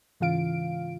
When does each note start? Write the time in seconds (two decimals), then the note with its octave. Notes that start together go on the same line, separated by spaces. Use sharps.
0.20 G#2 C#3 E3 F4 F5 D7